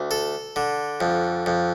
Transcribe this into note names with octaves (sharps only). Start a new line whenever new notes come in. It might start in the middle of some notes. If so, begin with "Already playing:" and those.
Already playing: D2
A4
D3
F2
F2